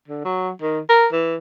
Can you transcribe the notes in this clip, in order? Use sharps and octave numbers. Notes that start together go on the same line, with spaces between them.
D3
F#3
D#3
A#4
E3